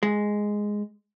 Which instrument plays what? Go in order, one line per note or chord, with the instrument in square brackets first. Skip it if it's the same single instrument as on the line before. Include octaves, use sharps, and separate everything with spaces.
[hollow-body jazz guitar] G#3